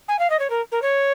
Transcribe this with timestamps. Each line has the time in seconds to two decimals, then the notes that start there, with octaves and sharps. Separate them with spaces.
0.08 G#5
0.19 F5
0.30 D#5
0.39 C#5
0.50 A#4
0.72 A#4
0.82 C#5